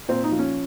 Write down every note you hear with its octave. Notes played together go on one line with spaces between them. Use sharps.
A#2 C4
D#4
F3
C#4